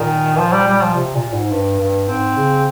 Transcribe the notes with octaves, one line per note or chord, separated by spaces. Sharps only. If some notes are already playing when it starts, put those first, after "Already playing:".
Already playing: A#2 D#3
F3
G3
G3
F3
C3
A#2
G#2
G2
G2
G#2 C4
C#3